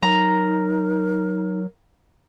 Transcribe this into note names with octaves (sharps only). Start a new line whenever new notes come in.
F#3 D#4 A#4 A#5